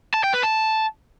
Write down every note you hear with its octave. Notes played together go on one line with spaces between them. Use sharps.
A5
G5
B4
A5